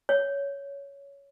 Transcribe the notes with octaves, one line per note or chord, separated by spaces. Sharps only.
C#5